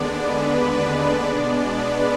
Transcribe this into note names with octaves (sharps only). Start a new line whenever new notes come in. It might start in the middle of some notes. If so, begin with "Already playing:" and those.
Already playing: D#2 D3 G#3 B3 D4 D5
B3 B4
B2 G#3 B3 D4 D5
B3 B4